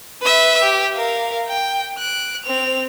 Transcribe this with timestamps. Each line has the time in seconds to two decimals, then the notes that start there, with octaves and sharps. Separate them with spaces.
0.21 B4 E5
0.63 G4
0.95 A#4 F5
1.48 G5
1.98 F#6 D7
2.44 C4 F7